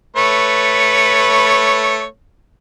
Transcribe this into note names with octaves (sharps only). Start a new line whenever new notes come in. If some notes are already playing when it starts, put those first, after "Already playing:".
A3 B4 C#5